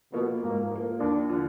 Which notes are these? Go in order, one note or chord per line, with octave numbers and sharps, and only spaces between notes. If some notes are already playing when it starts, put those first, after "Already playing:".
B2 F3 A#3
G#2 A#3
F3 A#3
D#2 D4
D3 F3